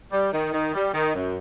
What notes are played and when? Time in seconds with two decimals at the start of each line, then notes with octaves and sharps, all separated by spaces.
0.11 G3
0.32 D#3
0.52 D#3
0.73 G3
0.93 D#3
1.15 F#2